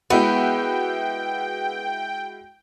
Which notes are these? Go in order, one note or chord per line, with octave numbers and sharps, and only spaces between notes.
G#3 B3 E4 F#4 G5